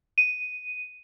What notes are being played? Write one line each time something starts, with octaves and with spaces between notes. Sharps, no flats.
D#7